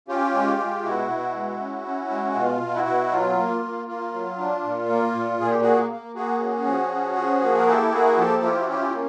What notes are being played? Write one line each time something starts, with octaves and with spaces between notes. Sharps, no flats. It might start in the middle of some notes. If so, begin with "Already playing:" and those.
C#4 F4 G4
G#3
G#3
B2 E4 F#4
B2
G#3
C#4
C#4
G#3
E4
B2 F4
B2
E4 F#4
B2
F#3 F4
A#3
A#3
A#3 F4
F#3
D4
A#2
A#3
A#2
A#2 G#4
G4
A#3 F#4 G#4
A#3
A#3 F#4 G#4
C#4
F3
C#4
F3
A#3
A#4
E4 G4 A4
A#3 F#4 G#4
F3 G4 A4
E4 F4 G4
F#4
C#4 F4 G4
F4
A#3